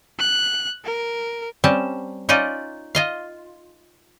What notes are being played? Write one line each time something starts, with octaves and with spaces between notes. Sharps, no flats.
F#6
A#4
G3 C4 C#4 A5
C#4 D#4 F4 D5 D#5
F4 D#5 F5